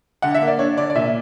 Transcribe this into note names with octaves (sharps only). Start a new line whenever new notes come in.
D3 F#5
E5
A#3
D5
D4 C#5
D3 D5
D5
A#2 E5